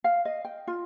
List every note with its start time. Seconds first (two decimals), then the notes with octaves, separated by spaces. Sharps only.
0.04 F5
0.25 D#5
0.45 G5
0.67 F4